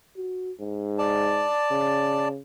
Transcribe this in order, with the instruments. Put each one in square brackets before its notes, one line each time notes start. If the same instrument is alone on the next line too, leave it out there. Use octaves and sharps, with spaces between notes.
[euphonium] F#4
G#2
[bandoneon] D5 A5
[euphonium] C#3